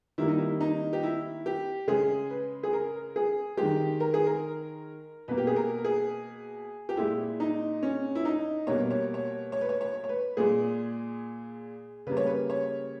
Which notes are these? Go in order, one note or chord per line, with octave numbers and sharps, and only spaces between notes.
D#3 G3 A#3 E4
D#4
E4
D#4
G4
E4
G4
C#3 G#3 G#4
B4
G#4
A#4
G#4
G#3 G4
D#3
A#4
G#4
A#4
B2 A#3 B4
G4
G#4
A#4
G#4
G4
A#2 G#3 E4
D#4
C#4
E4
D#4
B2 G3 A#3 C#5
C#5
C#5
C#5
B4
C#5
C#5
C#5
B4
A#2 G#3 G#4
C#3 G3 A#3 B4
C#5
B4
C#5